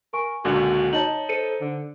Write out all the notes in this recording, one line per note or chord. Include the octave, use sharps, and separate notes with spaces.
A#4 G#5 C#6
C#2 A#2 D3 F#4
D#4 C#5 D#5 A5 F#7
A4 C5 C#7 D#7
D3